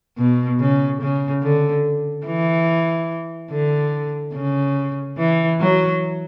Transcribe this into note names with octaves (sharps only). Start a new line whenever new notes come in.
B2
C#3
C#3
D3
E3
D3
C#3
E3
F#3